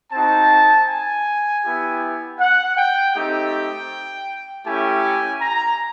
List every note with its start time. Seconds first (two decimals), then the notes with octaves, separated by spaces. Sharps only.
0.12 C4 D#4 F#4 A5
0.88 G#5
1.64 B3 E4 G4
2.40 F#5
2.78 G5
3.15 A3 C4 D#4 G4 G5
4.66 A3 C#4 E4 G4 G#5
5.42 A#5